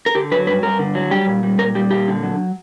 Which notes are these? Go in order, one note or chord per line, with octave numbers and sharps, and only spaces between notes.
A#4
D3 G4
F#3 B4
G2 B4
G2 A#4
D3
F#3
G3 G4
A#2
G3
A#2 A#4
G3 G4
A#2 G4
D3
F#3